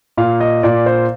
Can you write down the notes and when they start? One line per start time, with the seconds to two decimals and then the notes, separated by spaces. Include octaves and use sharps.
0.17 A#2 F5
0.41 D#5
0.63 A#2 D5
0.86 C5